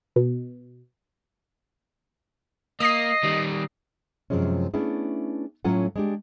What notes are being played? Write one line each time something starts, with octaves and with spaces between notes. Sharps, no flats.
B2
A#3 D#5 D#6 A#6 C7
D#3 G3
F#2 C3 D#3 F3 G#3 C#4
A3 B3 C#4 D4 E4 G#4
A2 F#3 C#4 F4 A4 F#5
G#3 D4 G4